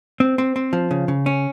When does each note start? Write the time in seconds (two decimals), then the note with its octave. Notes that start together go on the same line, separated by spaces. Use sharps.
0.20 C4
0.38 C4
0.56 C4
0.73 F3
0.91 C#3
1.08 C#3
1.26 C#4